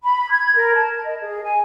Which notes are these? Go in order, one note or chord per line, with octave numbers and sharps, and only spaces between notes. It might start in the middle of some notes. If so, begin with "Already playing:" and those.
B5
G#6
A#4
A5
D#5
G#4
G#5